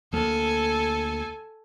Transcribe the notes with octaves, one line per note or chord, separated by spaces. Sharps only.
D2 A#3 A4 G#5